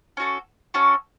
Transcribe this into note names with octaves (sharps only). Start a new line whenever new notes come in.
C#4 F#4 A4
C#4 F#4 A4